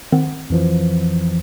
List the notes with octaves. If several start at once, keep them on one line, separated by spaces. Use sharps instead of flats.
D#3 C4 F#5
F2 E3 F3